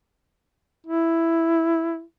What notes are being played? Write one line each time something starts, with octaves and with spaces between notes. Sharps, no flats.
E4